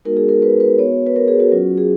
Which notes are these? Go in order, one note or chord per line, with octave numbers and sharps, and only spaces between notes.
G#3 B3 D#4 F#4 A#4
G#4
A#4
B4
B4
B3 F#4 C#5
B4
A#4
G#4
F#4
F#3 C#4 F4
G#4